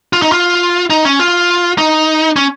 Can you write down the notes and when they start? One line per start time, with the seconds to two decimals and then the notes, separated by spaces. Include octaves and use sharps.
0.13 F4
0.22 D#4
0.32 F4
0.90 D#4
1.05 C#4
1.20 F4
1.78 D#4
2.36 C#4